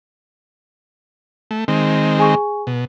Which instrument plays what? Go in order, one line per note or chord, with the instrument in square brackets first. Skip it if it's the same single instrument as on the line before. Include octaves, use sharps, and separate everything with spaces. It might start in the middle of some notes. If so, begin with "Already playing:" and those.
[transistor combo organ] A3
D#3 G#3 C4
[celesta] G#4 G#5 C#6
[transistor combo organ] B2